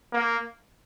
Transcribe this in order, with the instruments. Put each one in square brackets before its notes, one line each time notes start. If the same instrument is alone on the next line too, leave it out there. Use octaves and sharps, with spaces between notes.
[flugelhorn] A#3